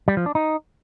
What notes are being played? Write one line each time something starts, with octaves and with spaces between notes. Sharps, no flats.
G3
F3
D4
D#4